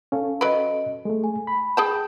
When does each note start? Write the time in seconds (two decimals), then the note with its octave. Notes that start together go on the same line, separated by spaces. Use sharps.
0.12 C#4 A4 F5
0.41 F#3 B4 D#5 D7
1.05 G#3 A3 A4
1.24 G#5
1.47 B5
1.77 G#4 G5 A5 G6